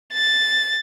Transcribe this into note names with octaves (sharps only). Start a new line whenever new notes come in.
A6